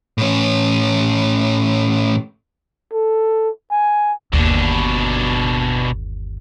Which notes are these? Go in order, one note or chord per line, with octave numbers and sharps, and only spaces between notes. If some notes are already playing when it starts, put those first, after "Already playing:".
A2 C#4
A4
G#5
G1 D#2 B2 D4